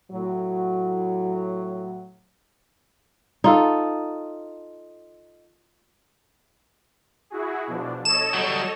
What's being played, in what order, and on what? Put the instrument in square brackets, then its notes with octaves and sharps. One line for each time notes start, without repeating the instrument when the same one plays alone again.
[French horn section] A2 F#3
[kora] D#4 F4 A4
[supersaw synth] E4 F#4 G#4
B2 F3 D4
[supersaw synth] A4 C#5 D#5 [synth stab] E7
[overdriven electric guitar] F#3 G3